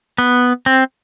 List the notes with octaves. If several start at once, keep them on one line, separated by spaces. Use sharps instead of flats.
B3
C4